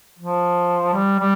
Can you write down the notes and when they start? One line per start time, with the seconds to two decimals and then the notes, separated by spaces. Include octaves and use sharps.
0.19 F3
0.93 G3
1.20 G3